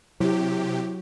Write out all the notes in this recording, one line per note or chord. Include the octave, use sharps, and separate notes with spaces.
C3 F#3 E4 G4